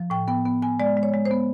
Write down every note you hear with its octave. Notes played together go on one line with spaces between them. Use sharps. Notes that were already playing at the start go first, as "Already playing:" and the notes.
Already playing: F3
A2 G5
B3 G5
B3
B3 G#5
G#3 D5
G#3
C#5
G#3
C5
B3